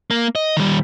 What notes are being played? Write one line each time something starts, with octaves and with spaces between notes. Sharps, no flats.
A#3
D#5
D#3 G3